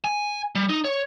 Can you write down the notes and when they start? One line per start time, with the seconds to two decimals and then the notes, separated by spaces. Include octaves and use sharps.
0.04 G#5
0.55 G3
0.70 D#4
0.85 C#5